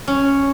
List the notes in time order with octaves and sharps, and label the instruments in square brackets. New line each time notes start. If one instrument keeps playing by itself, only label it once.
[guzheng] C#4